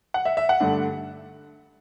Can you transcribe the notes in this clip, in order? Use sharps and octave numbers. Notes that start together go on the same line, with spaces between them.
F#5
E5
E5
F#5
G2 D3 A3 D4